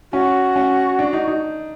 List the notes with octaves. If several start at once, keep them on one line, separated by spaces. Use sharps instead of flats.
C#4 F#4
C#4
D4
D#4
D#4